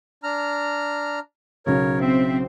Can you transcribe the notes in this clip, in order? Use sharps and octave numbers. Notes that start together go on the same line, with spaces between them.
D4 A#5 F6
B1 C#3 A#4 C#5
C4 E5